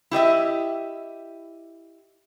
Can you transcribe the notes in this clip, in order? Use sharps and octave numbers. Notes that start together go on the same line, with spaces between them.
E4 G4 D#5 E5